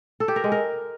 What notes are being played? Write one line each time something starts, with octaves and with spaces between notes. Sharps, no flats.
A4
G4
A#4
G#3
A#4